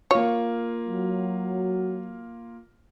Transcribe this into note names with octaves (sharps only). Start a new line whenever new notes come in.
A#3 F4 C#5
F#3